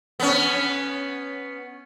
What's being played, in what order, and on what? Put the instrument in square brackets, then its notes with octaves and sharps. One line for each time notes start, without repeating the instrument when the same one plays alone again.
[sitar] B3 C#4